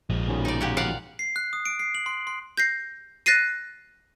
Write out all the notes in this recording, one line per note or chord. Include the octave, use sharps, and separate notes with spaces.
A#1 F3 G#3
B2 D#3 C#4
D#4 D5
A#2 G4 F#5
D5 F5 F#5
C7
F#6
D#6
D7
C7
F#7
C6
C6
G6 A#6 C7
F#6 A6 A#6 C7 D#7